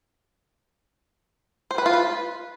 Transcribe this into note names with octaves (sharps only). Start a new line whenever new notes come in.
C5
B4
F4
B4